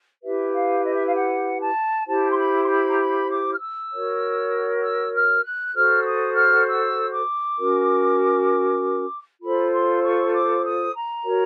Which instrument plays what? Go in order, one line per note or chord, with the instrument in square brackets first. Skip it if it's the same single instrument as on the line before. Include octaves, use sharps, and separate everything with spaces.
[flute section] E4 G4 B4 E5
F5
D#5
E5
F5
F#5
A5
E4 G4 C5 A5
C6
B5
C6
B5
A#5
B5
D6
F6
E6
F#4 A#4 C#5
E6
F6
F#6
F#4 A4 C5 F6
E6
D#6
F6
E6
D6
C#4 F#4 A#4
F4 A4 C5 B5
C6
C#6
D6
D#6
A#5
F#4 A#4 C#5